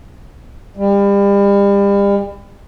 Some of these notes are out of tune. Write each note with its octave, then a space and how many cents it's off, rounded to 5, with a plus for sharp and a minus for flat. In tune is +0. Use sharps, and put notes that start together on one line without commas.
G3 +35